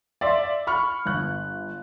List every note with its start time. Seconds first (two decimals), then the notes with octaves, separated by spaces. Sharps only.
0.21 D5 E5 F5 C6
0.67 B5 C#6 F6
1.05 G1 F#6